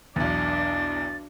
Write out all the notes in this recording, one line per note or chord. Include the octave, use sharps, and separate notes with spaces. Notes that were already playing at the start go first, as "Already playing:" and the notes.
B1 E2 D4 A6